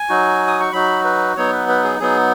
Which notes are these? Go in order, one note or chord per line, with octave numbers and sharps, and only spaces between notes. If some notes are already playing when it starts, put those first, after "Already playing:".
Already playing: G#5
F#3 D#4 F#4
D#6
C#6
F#3 D#4 F#4 B5
B4
F#3 B3 D#4 C#5
B4
B4
G#4
F#3 B3 D#4 G#4